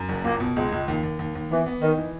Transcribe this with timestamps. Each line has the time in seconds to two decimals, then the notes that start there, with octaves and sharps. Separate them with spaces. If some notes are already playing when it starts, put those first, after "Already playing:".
Already playing: F#2
0.09 F#1
0.24 C#2 A#3
0.40 B2
0.56 C#2 G#3
0.72 C#2
0.88 D#2
1.03 D#2
1.19 D#2
1.35 D#2
1.51 E3 B3
1.66 B3
1.81 D#3 D#4
1.98 E3